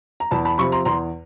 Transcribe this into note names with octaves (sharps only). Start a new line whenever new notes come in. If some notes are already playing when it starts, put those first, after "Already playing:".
A#5
E2 A5 B5
A5 B5
C3 F3 B5 C#6
A#5 C6
E2 A#5 C6